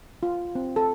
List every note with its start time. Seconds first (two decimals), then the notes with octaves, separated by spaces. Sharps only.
0.23 F4
0.55 C4
0.76 A4